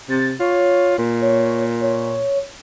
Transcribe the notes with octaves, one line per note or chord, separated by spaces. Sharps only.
C3 A6
F4 C#5
A#2
C#5
C#5